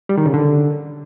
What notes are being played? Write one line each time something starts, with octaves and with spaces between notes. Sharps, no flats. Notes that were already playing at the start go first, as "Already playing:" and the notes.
G3
D#3
C#3
D3